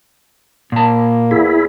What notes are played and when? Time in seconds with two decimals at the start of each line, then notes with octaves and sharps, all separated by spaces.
0.72 A#2 A#3 A5
1.31 E2 E4 G#4